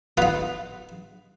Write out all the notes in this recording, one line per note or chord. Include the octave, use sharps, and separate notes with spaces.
B3 D#4 F4